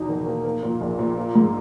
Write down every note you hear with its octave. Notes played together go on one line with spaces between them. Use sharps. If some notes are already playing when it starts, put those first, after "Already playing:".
Already playing: E2 B2 D#4
D#3
A#3
A#3
A#2
A#1
A#2
A#3
G#2